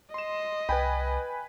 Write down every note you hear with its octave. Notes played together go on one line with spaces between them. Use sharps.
D#5 C6 E7
C2 B4 G5 G#5 B5